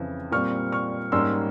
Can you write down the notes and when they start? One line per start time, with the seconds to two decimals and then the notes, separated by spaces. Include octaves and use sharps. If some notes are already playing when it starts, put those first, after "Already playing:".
Already playing: F2 C#3 E3
0.31 A#2 G3 C4 C#6 F6
0.72 C#6 F6
1.12 G#2 G3 A#3 C#4 C6 E6